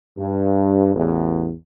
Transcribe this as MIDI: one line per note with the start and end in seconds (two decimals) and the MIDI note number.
0.18 0.94 43
0.94 1.51 33
0.94 1.51 40